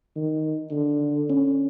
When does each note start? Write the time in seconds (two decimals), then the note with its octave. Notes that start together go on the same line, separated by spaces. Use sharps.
0.16 D#3
0.71 D3
1.29 C#4